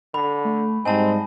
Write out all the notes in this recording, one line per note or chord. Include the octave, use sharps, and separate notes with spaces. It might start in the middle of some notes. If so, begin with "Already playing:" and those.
D3 B5
A3
G#2 G3 C4 D#5 G#5 A5